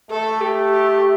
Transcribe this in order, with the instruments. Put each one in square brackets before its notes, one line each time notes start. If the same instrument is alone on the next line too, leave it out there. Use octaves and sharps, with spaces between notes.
[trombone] A3 [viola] A4
[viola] G4
G4